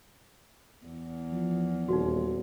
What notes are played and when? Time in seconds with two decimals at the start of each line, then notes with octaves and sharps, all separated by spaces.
0.86 E2
1.32 F3
1.88 D#1 D#4 F#4